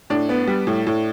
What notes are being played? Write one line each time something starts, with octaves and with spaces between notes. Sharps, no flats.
A2 D4
B3
G3
A2
A2